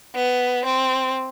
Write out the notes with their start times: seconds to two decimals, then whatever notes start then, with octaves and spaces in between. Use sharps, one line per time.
0.15 B3
0.65 C4